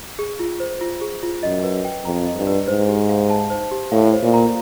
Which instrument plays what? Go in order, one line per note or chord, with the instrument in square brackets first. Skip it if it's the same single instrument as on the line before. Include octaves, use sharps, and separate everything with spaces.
[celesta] G#4
F4
C5
F4
G#4
F4
[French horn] F#2 [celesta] D#5
[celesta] B4
G5
[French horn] F2 [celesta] A#5
[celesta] D#5
[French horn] G2
[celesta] B4
[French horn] G#2 [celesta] C5
[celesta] G4
F5
A5
C5
G4
[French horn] A2 [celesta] F5
[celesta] C5
[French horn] A#2
[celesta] A#5